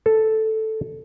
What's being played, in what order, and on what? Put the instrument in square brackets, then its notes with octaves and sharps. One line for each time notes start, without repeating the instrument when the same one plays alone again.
[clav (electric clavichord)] A4